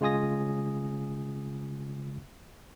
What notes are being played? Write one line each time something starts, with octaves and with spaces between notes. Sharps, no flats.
C#3 G#3 F4 G#5 D#6 A#6